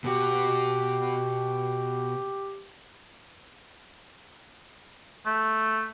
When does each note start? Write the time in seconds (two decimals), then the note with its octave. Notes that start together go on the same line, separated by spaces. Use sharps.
0.04 B2 F#4 G4
5.26 A3